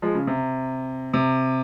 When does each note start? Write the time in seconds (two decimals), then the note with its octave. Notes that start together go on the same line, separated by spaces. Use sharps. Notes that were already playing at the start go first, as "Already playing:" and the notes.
0.02 F3 G#3
0.15 C#3
0.27 C3
1.14 C3